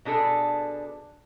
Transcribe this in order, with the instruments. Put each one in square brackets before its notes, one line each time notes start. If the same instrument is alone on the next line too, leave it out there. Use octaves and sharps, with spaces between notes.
[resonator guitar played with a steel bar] B2 D4 G#4 A4